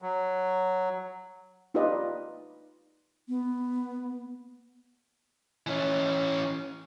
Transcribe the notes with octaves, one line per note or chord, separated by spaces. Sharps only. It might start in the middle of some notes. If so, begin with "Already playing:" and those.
F#3
D#4 F4 G4 B4 D5 D#5
B3
E3 C#4